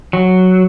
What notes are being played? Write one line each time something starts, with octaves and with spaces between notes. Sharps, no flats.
F#3